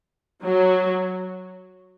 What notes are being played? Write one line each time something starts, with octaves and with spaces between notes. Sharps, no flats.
F#3